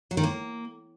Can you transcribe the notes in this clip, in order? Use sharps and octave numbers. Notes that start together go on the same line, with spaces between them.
F#3
D#3
A#3